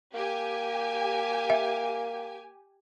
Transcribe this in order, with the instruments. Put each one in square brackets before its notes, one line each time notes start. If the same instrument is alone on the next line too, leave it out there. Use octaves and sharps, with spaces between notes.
[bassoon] A#3 [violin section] G4 G#5
[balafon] E5